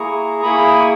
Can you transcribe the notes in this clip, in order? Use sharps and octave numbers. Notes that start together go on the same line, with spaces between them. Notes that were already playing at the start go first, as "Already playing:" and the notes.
Already playing: A#3 E4 G#4 A#5 C#6
A#3 E4 G#4 B5 D#6
C#6